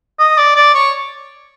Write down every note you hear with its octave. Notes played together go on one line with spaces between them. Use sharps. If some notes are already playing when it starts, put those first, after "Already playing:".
D#5
D5
D5
C#5